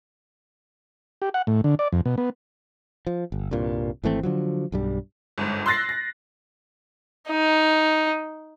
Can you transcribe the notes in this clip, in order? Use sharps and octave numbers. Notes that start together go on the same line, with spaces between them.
G4
F#5
A2
D3
D5
F2
B2
B3
F3
G1
C2 G2 A#2
G#1 E3 A3 C4
D3 F3 F#3
B1 G2 G3
G1 G#2
C6 E6 F#6 A6 A#6 C7
A#6
D#4